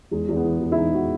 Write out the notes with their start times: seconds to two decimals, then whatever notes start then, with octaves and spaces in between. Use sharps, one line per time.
0.11 E2 G#3
0.29 E2
0.36 B3
0.44 E3
0.61 E2
0.72 E4
0.78 E3 D#4
0.94 E3 F#4